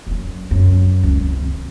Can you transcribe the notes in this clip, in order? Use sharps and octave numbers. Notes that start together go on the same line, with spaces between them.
F#1 F#2
F#2 C#3
C#2
C2
C3 D#3